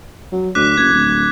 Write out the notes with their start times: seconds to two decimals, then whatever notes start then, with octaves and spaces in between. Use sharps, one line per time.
0.32 F#3
0.55 D2 D6 F#6 B6
0.77 F#1 G#6
0.92 D1